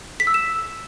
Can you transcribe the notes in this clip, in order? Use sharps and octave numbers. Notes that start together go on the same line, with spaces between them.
B6
E6
E7